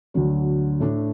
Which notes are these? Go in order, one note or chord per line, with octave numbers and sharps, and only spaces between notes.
D2 D3 F#3
A2 A3 D4